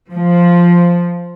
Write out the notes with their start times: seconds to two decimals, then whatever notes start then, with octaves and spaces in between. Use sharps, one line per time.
0.11 F3